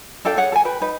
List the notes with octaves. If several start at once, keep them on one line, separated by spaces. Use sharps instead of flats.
D4 A4 F5 G5
G#4 C#5 F#5
A4 G#5
B4 G5
D#4 B4